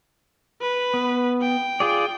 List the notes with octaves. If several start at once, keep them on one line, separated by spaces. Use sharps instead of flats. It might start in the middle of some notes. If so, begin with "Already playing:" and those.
B4
B3
G5
F4 G#4 D5